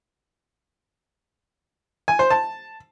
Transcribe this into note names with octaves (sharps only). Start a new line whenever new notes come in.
G#5
C5
A5